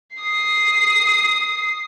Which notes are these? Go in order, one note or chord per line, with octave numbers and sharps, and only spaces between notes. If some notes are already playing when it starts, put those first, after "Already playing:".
D#6 C7